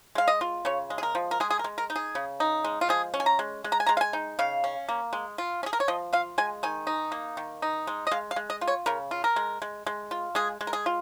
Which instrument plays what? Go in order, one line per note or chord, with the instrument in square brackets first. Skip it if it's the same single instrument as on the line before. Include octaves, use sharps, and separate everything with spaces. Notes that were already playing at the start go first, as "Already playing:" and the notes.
[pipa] G#3 F5
D#5
F4
C#3 C#5
G#3
G#4
A#4
F3
A#4
G#3 G#4
G#4
A#4
G#3
A#4
D#4
G#4
C#3
D#4
G#3
F4
F3 G#4
C#4
G#5
A#5
G#3
G#3
A#5
G#5
G#3 A#5
F5
G#5
D#4
C#3 F5
C#4
A#3
G#3
F4
C#4
G#4
A#4
C#5
F3 D#5
F4 F5
G#3 G#5
D#3 G#5
D#4
A#3
D#3
D#4
G#3
D#5
G#3 F5
F5
G#3
D#5
F4
C#5
C#3 A#4
F4
A#4
G#3
G#3
G#3
F4
G#3 G#4
G#3
A#4
G#4
F4